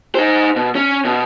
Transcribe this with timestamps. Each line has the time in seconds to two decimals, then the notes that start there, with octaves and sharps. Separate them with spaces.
0.15 D#4 C5
0.56 B2
0.75 C#4
1.05 B2